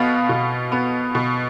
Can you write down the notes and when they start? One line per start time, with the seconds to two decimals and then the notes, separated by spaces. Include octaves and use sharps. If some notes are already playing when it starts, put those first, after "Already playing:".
Already playing: B2 B3 F5
0.29 B2
0.72 B3
1.15 B2